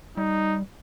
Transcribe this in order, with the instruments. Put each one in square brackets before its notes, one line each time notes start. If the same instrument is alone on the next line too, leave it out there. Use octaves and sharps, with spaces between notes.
[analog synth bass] G3 [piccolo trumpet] D#4